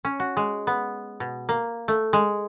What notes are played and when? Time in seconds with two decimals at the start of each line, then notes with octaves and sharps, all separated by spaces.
0.05 C#4
0.20 F#4
0.37 G#3
0.67 B3
1.20 B2
1.49 A#3
1.88 A3
2.13 G#3